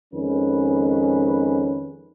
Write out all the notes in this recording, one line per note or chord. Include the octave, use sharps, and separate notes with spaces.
F2 D#3 G#3 C#4 B4